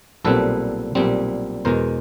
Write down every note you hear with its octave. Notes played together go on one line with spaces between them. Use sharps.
B1 A#2 G3 C4 A4 B4
B1 A#2 G3 C4
E2 B2 G#3 A#4 C5